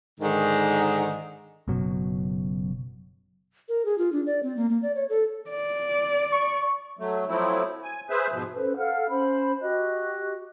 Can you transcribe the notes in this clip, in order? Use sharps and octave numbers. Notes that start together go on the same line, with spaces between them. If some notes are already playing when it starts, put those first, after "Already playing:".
G#2 D3 D#3
F#1 F#2 B2 F#3
A#4
G#4
F4
D4
D5
C4
A#3
A#3
D5
C#5
A4
D5
C#6
F#3 A3
F3 F#3 A3 C4 E4
G#5
G#4 B4 C5 E5
G#2 B2 F3
C#4 A4 B4 C5
A4 F5 F#5 F6
C#4 C5 B5
F#4 G4 D#5 F#6